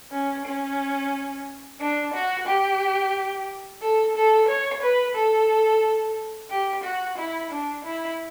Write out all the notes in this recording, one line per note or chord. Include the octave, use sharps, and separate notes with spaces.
C#4
C#4
D4
F#4
G4
A4
A4
C#5
B4
A4
G4
F#4
E4
D4
E4